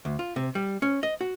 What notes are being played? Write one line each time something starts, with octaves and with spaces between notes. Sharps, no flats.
D2
F4
C3
G3
C#4
D#5
F#4